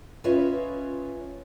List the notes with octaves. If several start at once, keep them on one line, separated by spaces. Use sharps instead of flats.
C#4 F4 B4 C#5 D#5 E5